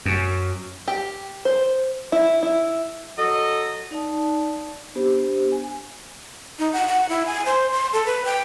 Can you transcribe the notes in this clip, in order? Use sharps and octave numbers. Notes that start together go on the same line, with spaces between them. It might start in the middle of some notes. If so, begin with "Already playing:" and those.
F#2
G4
C5
E4
E4
F#3 A4 D#5
D#4 D5 F5 A5
B3 D4 G4 C5
G#5
D#4
F#5
F#5
E4
G#5
C5
C6
A4
B4
G5